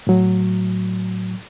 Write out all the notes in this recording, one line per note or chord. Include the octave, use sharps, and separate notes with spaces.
A2 F#3